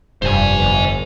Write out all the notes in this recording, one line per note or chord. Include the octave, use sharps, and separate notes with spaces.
F1 G2 C5 G#5
G1